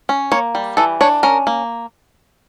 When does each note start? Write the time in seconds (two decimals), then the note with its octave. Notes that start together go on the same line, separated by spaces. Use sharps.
0.09 C#4
0.32 A#3 C#5
0.55 G3
0.77 E3 A4
1.01 D4 C#5
1.23 C#4 A#4
1.47 A#3